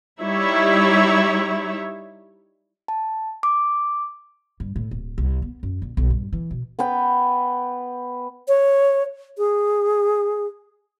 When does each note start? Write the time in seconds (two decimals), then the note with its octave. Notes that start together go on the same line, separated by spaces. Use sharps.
0.20 G3 D#4 E4 C#5 E5
2.88 A5
3.43 D6
4.60 G2
4.76 A2
4.91 D1
5.18 C2
5.42 B3
5.63 F#2
5.82 A#1
5.97 B1
6.10 G2
6.33 E3
6.51 B2
6.79 B3 B4 G5
8.48 C#5
9.38 G#4